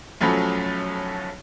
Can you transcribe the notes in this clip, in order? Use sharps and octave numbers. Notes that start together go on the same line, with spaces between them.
B1 F3 F#3 A3 C#4 B5